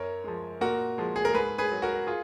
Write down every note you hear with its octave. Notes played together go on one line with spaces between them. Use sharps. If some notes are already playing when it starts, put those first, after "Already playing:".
Already playing: F#2 A#4 C#5
F3 G#3
A#2 F#4 A#4
F3 G#3
G#4
A#4
G#2 G#4 B4
G#4 B4
F#3
F#4 A#4
F4 G#4